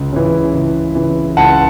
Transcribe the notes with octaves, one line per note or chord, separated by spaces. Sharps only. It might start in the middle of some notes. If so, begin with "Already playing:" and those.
Already playing: C#2
C#3 E3
C#2
C#3 E3
C#2 F#5 A5